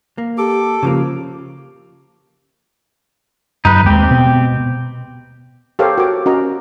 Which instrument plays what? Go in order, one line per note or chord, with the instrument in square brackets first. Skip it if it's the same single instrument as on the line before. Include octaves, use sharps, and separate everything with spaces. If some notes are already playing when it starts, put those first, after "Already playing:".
[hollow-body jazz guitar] A#3
[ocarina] G4 [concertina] A4 D6
[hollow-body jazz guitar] C#3 F3 A#3
[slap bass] F#2 [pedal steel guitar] D#4 B4
[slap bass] D#2 G#3 A3 [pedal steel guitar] C4 G4
[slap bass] B2
[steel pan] G4 A4 A#4 C5 C#5 F5
F#4 A#4 D6
C#4 F#4 A#4 D#5 A#5